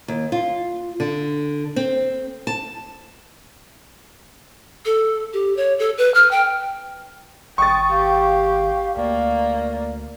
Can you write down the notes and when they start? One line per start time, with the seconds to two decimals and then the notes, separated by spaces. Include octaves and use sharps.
0.08 D#2
0.32 F4
1.00 D3
1.76 C4
2.47 A5
4.86 A4
5.33 G4
5.57 C#5
5.79 A4
5.98 B4
6.14 F6
6.31 G5
7.58 G#1 G5 C#6 D#6 A6
7.90 G4 F5
8.97 D2 A#3 D5